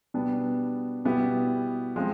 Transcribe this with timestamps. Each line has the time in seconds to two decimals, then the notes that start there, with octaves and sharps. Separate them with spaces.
0.14 B2 G3 B3 D4
1.05 B2 G3 B3 E4 G4
1.96 F3 G#3 C4